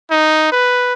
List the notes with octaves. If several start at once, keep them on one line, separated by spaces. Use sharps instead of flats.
D#4
B4